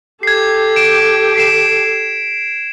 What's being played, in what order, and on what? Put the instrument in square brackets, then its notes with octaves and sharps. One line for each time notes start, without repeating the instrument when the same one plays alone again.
[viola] G4 A4 [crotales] G#6 C7
[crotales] D7 E7
B6 C7 E7